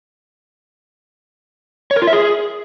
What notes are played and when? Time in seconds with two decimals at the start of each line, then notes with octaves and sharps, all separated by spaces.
1.91 C#5
1.96 A#4
2.02 F4
2.07 E5
2.13 G#4